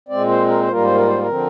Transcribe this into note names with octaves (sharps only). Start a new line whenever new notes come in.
A#2 G#3 C4 D5
C5
A#4
C5
G#2 G3 A#3 F4 A#4
C5
A#4
C5
A#4
D3 F3 C4